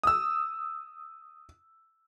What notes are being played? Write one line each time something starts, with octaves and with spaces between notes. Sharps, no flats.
D#6 E6